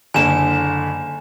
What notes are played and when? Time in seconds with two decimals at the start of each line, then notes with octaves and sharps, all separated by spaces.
0.14 F#1 D3 G#5 E7